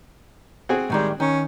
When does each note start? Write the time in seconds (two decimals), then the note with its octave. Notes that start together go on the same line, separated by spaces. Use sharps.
0.69 C4 F#4 G#4
0.90 A2 D#3 G3 G#3
1.20 D#3 C#4